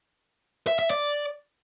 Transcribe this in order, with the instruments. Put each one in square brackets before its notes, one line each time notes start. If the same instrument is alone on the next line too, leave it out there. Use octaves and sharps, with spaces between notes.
[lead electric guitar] E5
E5
D5